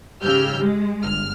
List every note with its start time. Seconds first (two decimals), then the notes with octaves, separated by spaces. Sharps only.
0.22 G#2 C#3 G4 E6 F6 G6
0.60 G#3
1.03 G1 F6